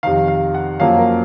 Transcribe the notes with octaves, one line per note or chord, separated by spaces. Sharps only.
F2 C3 D#3 F5
F5
F#5
F#2 F3 A#3 C#4 F5
A#4